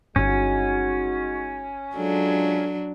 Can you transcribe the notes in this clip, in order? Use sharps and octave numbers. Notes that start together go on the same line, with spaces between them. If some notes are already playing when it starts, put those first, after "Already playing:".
G1 G2 G#3 C#4 D#4 F#4
F#3 G#3 D4 F4 A4